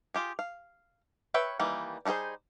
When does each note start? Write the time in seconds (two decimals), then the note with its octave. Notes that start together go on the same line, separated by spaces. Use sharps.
0.14 F4 G4 G#4
0.39 F5
1.34 B4 C#5 E5 G5
1.59 D#3 E3 G3 A#3
2.05 G3 D#4 F#4 G#4 C5